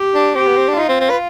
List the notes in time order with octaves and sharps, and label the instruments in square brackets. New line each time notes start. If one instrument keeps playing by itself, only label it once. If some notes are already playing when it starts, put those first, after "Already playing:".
Already playing: [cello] G4
[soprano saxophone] D4
[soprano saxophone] C4 [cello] G4
[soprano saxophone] B3
C4
D4
[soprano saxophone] D#4 [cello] F4
[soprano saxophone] C4
C4
B4